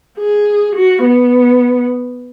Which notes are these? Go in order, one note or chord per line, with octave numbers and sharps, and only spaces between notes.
G#4
F#4
B3